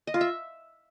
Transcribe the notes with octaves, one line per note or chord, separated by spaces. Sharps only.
D#5
F4
E5